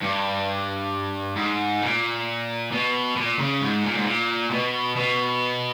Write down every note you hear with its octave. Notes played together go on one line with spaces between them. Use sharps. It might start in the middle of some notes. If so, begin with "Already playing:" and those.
G2
G#2
A#2
B2
A#2
C#3
G#2
A#2
G#2
A#2
B2
B2